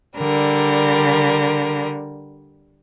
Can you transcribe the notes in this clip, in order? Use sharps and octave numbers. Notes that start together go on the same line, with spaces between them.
D3 G3 A#4